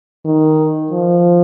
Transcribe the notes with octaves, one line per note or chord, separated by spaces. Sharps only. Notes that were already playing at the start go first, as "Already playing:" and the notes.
D#3
F3